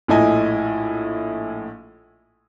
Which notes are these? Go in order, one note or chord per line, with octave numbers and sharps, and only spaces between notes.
A#1 A2 E4 D#5 G#5